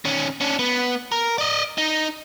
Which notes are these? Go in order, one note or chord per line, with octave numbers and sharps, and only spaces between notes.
D#3 C#4
C#4 D4
B3
A#4
D5 D#5
D#4